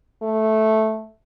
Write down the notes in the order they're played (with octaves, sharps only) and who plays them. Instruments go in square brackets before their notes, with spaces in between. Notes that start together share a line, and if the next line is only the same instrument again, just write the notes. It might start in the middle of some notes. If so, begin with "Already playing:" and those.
[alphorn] A3